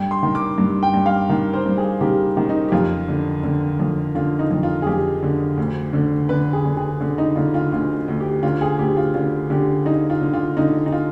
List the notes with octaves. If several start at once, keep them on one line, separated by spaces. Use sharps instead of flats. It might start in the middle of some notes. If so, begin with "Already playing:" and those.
Already playing: G2 G5
C6
D#3
D6
G2
G5
G2
F5
D#3
C5
G2
G#4
D#3 G4
D#3
D#4
G4
F2 F4
D3
D3
F2
D3 F4
D#4
F2
F4
G#4
F2 G4
D3
D2
D3
D3 B4
G#4
D3
G#4
D3
D#4
D3 F4
F4
D2 F4
D2
G4
D3 F4
G#4
D2 G4
F4
D3 F4
D3 G4
D3 D#4
F4
D3
F4
D3 D#4
D#4
F4